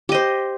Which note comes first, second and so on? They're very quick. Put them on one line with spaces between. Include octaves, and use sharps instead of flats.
G4 D#5 C5